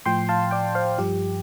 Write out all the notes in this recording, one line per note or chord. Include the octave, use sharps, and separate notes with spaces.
A2 F3 G5 C6
F5 A5
D5 G5
C5 F5
G2 F3 G4